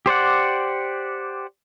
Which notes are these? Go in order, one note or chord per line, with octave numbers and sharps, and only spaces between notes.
G4 C5 D5 F#5